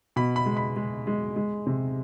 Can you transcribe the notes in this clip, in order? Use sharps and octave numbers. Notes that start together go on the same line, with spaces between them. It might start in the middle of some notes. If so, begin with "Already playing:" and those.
B2 B5
B5
G#3
B5
G#3
G#3
G#3
C3